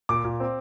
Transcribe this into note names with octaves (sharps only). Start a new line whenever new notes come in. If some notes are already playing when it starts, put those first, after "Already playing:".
A#2 D6
A#2
C4